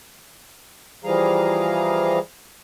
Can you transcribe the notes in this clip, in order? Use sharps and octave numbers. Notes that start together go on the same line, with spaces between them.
E3 F3 G3 G#4 F5 A#5